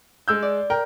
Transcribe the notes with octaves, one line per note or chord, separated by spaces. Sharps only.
G#3 E6 G6
D5
A#4 G5